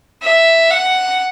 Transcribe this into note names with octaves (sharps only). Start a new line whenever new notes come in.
E5
F#5